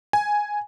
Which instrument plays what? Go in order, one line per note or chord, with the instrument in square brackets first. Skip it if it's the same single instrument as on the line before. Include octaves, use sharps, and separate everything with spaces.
[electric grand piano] G#5